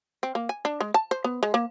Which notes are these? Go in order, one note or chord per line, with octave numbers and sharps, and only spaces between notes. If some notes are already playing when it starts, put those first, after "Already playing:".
C4
A#3
G#5
D4
G#3
A5
C5
B3
G#3
A#3